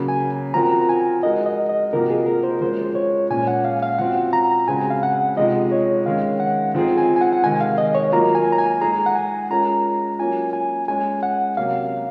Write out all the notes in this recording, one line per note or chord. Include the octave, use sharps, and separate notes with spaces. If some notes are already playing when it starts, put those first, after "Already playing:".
Already playing: C#3 F#3 A#3
G#5
F3 C4 F#4 A#4 A#5
A#5
G#5
G#3 D#4 F#4 A#4 D#5
D#5
D#5
C3 F3 A#3 D#4 F#4 A#4
G#4
A#4
C5
F3 G#3 C#4 F#4 A#4 C5
C#5
A#2 G#3 C#4 G#5
F#5
F5
F5
F3 C4 F#4 F#5
A#5
C#3 G#3 C4 F#4 G#5
F5
F#5
C3 F3 G#3 D#4 D#5
C#5
D#3 G#3 C#4 F5
F#5
F3 C4 D#4 G#4
G#5
G#5
F#5
F#5
C3 D#3 G#3 G#5
F5
D#5
C#5
F#3 A#3 F4 A#4 A#5
G#5
A#5
G#5
G#3 D#4 G#4 A#5
F#5
G#5
G#3 C#4 F4 A#4 A#5
F#3 A#3 C#4 F4 G#5
G#5
G#3 C#4 G#4 G#5
F#5
C3 F#3 A#3 C#4 F5